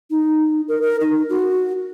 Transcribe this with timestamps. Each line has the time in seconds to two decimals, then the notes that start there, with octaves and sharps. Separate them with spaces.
0.11 D#4
0.68 A#4
0.82 A#4
1.01 D#4
1.29 F#4